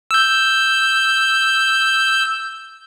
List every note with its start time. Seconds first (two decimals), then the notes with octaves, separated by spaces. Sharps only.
0.11 E6 G6